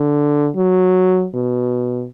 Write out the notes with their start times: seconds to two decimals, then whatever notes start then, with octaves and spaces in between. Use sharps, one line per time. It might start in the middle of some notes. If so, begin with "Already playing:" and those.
Already playing: D3
0.56 F#3
1.35 B2